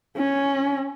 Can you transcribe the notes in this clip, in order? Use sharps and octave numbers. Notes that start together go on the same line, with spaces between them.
C#4